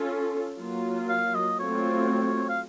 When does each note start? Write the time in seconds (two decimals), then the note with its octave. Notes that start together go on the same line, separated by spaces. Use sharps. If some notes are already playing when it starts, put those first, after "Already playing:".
Already playing: C#4 F4 A4
0.58 F#3 A#3 F4
1.09 F5
1.34 D#5
1.59 F#3 A3 C4 F4 C#5
2.49 F5